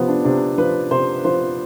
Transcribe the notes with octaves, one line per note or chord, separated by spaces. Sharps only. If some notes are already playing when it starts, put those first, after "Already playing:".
Already playing: C3 F3 B3
D4
C3 D4
F3 B4
C3 C5
F3 C5